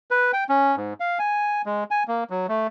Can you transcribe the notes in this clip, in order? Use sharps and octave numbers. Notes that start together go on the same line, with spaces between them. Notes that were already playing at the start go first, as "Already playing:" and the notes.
B4
G5
C#4
G#2
F5
G#5
G#3
G#5
A#3
F#3
A3